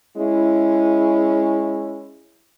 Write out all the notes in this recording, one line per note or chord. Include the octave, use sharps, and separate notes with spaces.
G#3 C#4 E4